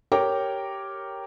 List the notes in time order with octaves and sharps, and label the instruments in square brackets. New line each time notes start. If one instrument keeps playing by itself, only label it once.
[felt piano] G4 A#4 C#5 G5 D6